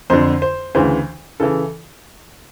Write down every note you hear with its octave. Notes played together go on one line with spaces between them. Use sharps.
F2 D3 C5
C5
D2 C#3 E3 C5
C#3 E3 A4